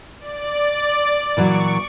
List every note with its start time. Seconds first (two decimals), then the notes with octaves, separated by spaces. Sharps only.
0.20 D5
1.37 A#2 E3 F#3 C#6 D7